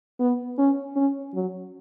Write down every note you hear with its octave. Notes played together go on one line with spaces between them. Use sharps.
B3
C#4
C#4
F#3